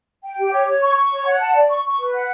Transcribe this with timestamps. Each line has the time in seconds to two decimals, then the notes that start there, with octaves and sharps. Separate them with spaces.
0.24 G5
0.38 G4
0.52 C#5
0.67 C#5
0.82 C#6
0.96 C#6
1.11 C#5
1.26 F#5
1.40 A5
1.55 D5
1.70 C#6
1.84 C#6
1.99 B4
2.13 F#5